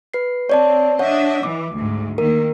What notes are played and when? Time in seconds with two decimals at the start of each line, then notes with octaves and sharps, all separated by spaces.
0.14 B4 C7
0.49 C4 C#5 D5 A5
0.99 D4 C#5 D#5 E5 F#5
1.43 E3 D6
1.76 D2 G#2
2.18 D#3 A#3 A#4